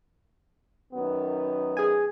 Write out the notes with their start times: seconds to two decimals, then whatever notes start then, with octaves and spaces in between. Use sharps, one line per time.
0.93 F#2 D#3 B3
1.77 G#4 G#5